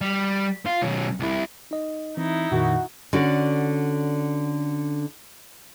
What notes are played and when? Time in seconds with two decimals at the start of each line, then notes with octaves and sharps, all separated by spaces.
0.01 G3
0.66 F4
0.83 B1 C#4
1.20 C2 E4
1.71 D#4 D#5
2.17 E3 C4 D#4 E4
2.51 F2 A#2 D#3 F#4
3.13 D3 C#4 F#4 D5